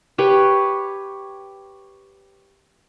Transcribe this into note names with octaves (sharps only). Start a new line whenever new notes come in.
G4 B4 C#5